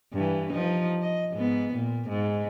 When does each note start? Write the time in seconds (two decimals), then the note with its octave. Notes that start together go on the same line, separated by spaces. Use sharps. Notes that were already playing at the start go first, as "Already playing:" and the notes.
0.13 G2 E3
0.52 F3 D#4
1.01 D#5
1.32 G#2 B3
1.73 A#2
2.09 G#2